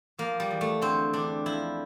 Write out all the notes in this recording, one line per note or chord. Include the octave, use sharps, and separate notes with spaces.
F3 A#3
G3
E2
A3
D3 C4
E2 D4
F3 E4